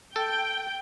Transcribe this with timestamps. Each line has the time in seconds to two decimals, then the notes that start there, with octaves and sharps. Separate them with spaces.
0.16 A4 G5